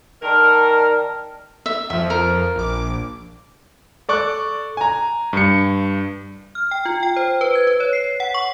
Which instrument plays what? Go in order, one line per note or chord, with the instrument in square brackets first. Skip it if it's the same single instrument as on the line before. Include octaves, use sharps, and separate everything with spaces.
[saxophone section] D#3 A#4 [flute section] D5 A5 F6
[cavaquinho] E5
[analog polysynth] F2 F3 [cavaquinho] E5
[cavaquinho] A#4
[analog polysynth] A#1 D6
[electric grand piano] A4 D5 C#6 D6 F#6
G#5 A#5
G2 C#7
[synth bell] F6
G5
F4
G5
C5
B4
G#6
B4
C#5
C7
F#5
C#6